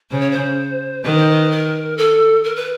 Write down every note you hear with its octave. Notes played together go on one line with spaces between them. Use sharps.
C#3 C5
C#5
C5
D#3 B4
C5
B4
A#4
A4
A#4
B4